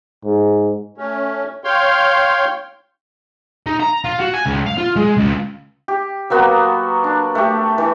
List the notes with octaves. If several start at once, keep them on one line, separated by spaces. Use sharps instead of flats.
G#2
A3 C#4
C#5 F5 G5 C6
D#4
A#5
F4
F#4
G#5
C#2
F5
F4
G#3
C#2
G4
F#3 A#3 B3 F#4
D4
A3 G4
E3